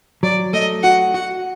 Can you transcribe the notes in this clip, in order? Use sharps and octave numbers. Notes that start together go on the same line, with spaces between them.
F#3 D5
A3 D#5
F#4 F#5
F#4 F#5